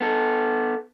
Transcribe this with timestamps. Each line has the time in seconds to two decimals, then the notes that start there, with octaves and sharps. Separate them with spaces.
0.01 B3 A4